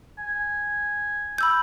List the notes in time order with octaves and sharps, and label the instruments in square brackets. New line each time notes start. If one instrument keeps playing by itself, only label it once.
[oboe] G#5
[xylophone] B5 E6 G6